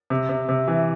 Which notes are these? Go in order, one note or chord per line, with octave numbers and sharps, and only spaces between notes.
C3
C3
C3
E3